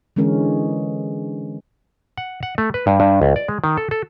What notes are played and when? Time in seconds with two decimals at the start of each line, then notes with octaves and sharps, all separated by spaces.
0.16 D3 E3 G#3 C#4 A#4
2.18 F#5
2.43 F#5
2.58 A3
2.74 B4
2.87 G2
3.00 G2
3.22 C#2
3.36 D5
3.48 G#3
3.64 D#3
3.77 A4
3.91 A4